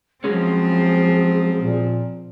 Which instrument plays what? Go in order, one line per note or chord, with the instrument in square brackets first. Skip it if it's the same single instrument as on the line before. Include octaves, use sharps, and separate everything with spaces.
[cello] F3 C4 [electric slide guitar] F#3 G#3 C#4 [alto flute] G#4
[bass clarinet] A#2